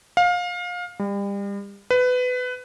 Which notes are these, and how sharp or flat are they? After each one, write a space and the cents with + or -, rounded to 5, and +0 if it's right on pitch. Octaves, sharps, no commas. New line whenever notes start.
F5 +25
G3 +35
B4 +20